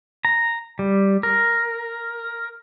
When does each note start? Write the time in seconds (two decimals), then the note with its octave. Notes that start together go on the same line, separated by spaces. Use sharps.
0.25 A#5
0.79 G3
1.23 A#4